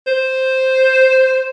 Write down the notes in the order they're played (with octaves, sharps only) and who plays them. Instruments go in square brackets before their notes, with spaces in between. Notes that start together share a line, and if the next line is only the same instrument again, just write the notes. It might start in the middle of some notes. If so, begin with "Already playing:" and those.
[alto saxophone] C5